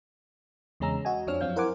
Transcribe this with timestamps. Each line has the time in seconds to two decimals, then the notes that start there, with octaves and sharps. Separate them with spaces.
0.80 E2 C#3 G#3 C#4 A#5 E6
1.05 F#4 D#5 G#5
1.27 F2 F3 D4 C#5 F6
1.41 F#2 F3 C4 F5 G6
1.56 E4 A#4 C5 F#5 G#5 D6